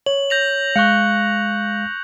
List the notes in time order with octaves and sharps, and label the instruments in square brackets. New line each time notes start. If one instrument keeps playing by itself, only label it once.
[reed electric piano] C#5 [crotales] F#7
[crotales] G6 A#6 F7
[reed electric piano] G#3 F5 [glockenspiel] C#6 F#6 C#7